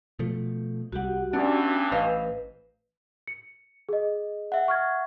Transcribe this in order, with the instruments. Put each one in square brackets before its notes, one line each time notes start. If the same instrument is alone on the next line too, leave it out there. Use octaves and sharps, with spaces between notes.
[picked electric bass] B2 F3 A3
[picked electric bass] C2 G3 [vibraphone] F#4 G4 F#5
[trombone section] G2 E3 [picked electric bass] B3 C#4 [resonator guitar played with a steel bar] D4
[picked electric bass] A1 [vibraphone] B4 [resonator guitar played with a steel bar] C5 D#5 F5
[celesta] C#7
G#4 D#5
[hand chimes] E5 F#5
[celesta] C#6 F6 G#6